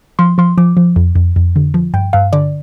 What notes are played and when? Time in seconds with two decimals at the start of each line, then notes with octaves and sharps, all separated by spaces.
0.19 F3 C6
0.38 F3 C6
0.58 F3 D6
0.77 F3
0.96 F2
1.15 F2
1.36 F2
1.56 D3
1.74 F3
1.94 G2 G5
2.13 G2 F5
2.33 D3 D5